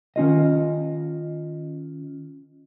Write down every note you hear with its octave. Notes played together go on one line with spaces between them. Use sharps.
D#3 C#4 F4 D#5